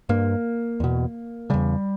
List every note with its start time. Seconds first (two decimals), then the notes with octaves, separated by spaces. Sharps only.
0.09 G2 A#3
0.80 E2 B2
1.50 E2 C#3 G3